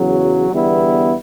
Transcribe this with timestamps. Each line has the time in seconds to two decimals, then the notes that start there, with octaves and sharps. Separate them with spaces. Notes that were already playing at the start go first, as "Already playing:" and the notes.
Already playing: E2 C#3 F#3
0.51 E2 D3 G3 B3 E4